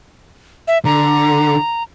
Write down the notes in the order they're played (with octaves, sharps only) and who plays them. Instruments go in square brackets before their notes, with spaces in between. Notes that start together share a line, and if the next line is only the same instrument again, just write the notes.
[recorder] E5
[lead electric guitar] D3 [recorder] A#5